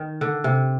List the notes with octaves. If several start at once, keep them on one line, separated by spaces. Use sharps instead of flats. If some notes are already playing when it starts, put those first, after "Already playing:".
Already playing: D#3
D3
C3